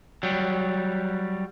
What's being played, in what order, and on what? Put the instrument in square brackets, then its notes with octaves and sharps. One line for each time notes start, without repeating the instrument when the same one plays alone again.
[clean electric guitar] F#3 G3